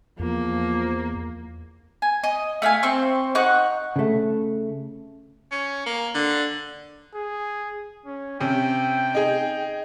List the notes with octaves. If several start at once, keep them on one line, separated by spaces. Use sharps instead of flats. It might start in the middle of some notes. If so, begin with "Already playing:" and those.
E2 F3 A#3
G#5
D#5
A3 E4 F5 G#5
C4 C5 C#6
D#4 F#5 C#6 F#6
C#3 A3
C#4
A#3
D3
G#4
C#4
C3 C#4 G5
D#4 G#4